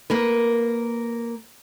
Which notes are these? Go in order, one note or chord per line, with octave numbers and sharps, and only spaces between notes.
A#3 A#4 B4